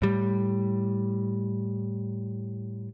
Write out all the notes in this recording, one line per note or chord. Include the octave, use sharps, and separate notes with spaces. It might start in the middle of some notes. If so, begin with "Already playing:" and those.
A2 G3